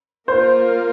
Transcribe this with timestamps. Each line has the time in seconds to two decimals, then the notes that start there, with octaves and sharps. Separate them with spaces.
0.28 A#3 F4 A#4 C5